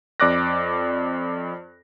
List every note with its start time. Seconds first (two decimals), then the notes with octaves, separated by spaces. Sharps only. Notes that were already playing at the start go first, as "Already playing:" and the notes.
0.20 F2 D5 D6 F#6 A#6